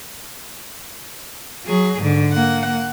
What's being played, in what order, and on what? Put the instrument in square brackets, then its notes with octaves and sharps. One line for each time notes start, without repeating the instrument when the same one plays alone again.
[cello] F#3 G#4
G#2 D3
A#3 F#5